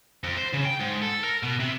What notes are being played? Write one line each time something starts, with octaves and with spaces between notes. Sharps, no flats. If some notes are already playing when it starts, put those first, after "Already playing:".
F2
C5
C#3
G5
G#2
A4
A#4
B2
C3